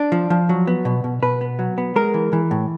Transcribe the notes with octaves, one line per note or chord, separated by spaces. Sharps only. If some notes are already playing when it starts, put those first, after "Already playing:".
Already playing: D4
F3
F3
F#3
B3
B2
B2
B2 B4
B3
F#3
B3
G#3 A#4
E3
E3
A2